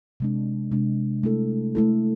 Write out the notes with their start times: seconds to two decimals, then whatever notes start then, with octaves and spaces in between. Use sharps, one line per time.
0.20 C3 G#3 D4
0.71 C3 G#3 D4
1.23 A3 E4 A4
1.75 A3 E4 A4